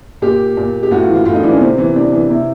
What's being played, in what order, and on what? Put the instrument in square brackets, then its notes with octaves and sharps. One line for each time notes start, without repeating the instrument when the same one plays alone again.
[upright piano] A#2 G4
A#2
G4
A2 F#4
F4
E3
F4
A2 F4
D#4
E3 D4
C#4
C3 C4
E3 C4
C3 D4
E3
C3 E4